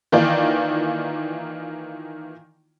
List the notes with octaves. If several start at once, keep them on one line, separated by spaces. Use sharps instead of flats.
D#3 E3 A#3 D#4 F4 D5